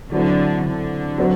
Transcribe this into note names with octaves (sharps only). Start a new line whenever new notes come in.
D3 F#3 C4 E4
D3
F#3 C4